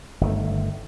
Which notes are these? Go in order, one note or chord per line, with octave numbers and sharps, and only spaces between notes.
G1 D#3 A3